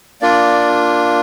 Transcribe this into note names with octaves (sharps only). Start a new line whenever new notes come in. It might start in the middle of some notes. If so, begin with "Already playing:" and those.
A#3 D4 F4 D5